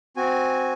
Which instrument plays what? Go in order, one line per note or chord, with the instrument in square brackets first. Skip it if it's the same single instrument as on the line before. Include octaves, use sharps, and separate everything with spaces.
[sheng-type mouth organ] C4 F#4 G#5